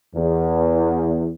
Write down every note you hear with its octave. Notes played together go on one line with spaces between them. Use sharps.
E2